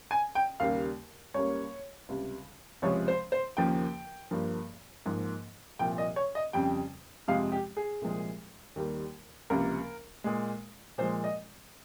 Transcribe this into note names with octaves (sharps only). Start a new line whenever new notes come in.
G#5
G5
D#2 C#3 G3 A#3 F5
C#2 C#3 G3 A#3 C#5
C#2 C3 G3
C#2 C3 F3 G#3 C#5
C5
C5
D#2 C#3 F3 A#3 G5
G2 F3 A#3
G#2 F3 A#3
C2 A#2 F3 G5
D#5
C#5
D#5
F2 C#3 G3 G5
F2 C3 F3 G#3 F5
G4
G#4
C2 A#2 F3 G#3
D#2 D#3 G3 A#3
C#2 C3 F3 A#3 A#4
A#2 G#3
A#2 F3 G#3 C5
D#5